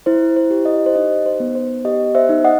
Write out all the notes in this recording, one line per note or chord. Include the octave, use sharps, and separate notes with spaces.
E4 C5
C5
G4
D#5
C5
D#4 D#5
C5
B3
C5
G4 D#5
C5 E5
D#4
D#5 F#5